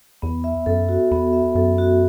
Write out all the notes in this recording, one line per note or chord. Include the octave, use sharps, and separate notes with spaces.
E2 B3
E5
F#2 A4
F#4
E2 B3
E5
F#2 A4
F#4